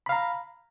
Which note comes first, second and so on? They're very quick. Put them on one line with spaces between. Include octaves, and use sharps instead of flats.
B5 F5 A#5